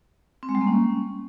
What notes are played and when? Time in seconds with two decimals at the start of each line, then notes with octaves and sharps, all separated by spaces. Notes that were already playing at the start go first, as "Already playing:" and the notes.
0.43 C4
0.49 G#3
0.55 G3
0.61 A#3
0.67 C#4